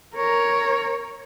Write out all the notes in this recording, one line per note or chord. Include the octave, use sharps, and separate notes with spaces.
A#4 C#5